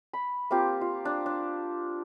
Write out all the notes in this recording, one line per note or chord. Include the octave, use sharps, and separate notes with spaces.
B5
A#3 C4 F4 G4
F4
D4
D4